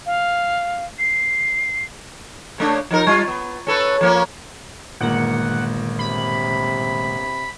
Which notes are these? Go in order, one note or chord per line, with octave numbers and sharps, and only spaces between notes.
F5
C7
C#3 A3 D4
F3 D#4 A#4
G3 F4
B3
C#4 A4 B4
F3 A#3 C#4
G1 A#2 D#3 G#3 A#3 F#5
C3 B5